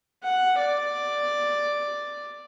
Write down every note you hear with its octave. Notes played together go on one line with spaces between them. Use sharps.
F#5
D5